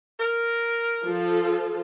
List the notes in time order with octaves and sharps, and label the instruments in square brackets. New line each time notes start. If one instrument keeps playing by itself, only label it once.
[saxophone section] A#4
[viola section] F3 F4 A4